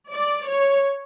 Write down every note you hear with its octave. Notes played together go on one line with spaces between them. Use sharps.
D5
C#5